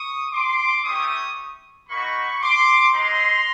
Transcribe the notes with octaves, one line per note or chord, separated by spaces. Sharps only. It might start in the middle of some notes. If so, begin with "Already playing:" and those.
Already playing: C#6 D#6
C6 D6
A3 C#4 E4 G4 C#6 D#6
A#3 D#4 F#4 B5 C#6
C6 D6
G#3 C4 D#4 A#5 C6